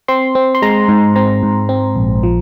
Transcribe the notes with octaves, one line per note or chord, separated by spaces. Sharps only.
C4 C6
C4
C6
G#3 A#5
G#2
C4 A#5
G#2
C4
A#1
F3